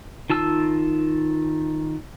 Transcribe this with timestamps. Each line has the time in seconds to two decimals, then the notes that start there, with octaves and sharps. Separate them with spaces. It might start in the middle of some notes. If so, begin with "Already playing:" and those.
0.30 D#3 F4 A5 E6